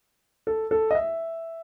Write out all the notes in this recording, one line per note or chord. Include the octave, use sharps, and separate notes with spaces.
A4
A4
D#5
E5